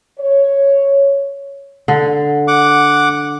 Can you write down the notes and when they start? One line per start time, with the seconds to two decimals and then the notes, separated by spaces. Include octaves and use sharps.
0.19 C#5
1.88 D3
2.48 F#5 D6